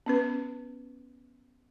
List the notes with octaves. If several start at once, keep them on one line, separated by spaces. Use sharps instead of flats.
B3 C#4 B4